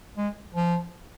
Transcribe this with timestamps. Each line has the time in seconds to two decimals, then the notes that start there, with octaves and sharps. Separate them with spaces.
0.17 G#3
0.54 F3